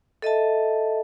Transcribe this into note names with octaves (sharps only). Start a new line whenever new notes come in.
A4 D#5 E5 A5